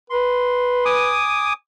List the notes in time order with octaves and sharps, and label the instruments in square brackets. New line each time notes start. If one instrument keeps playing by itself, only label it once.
[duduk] B4 [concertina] C6
[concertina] G#5 D6 D#6